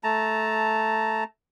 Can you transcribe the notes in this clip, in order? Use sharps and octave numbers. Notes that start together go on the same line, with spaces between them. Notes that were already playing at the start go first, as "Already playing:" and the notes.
A3 A5 A#5